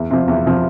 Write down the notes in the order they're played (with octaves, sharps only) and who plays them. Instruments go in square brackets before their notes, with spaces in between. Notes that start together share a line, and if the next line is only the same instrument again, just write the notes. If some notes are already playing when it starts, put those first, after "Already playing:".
Already playing: [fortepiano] E2
C3 F3
E2
C3 F3